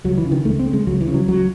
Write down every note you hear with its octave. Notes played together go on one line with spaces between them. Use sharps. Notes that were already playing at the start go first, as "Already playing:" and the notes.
C#2 F#3
E3
C#3
D#3
C#2 A3
C4
C#3
G#3
C#2 F#3
E3
C#3
F#3
C#2 F#3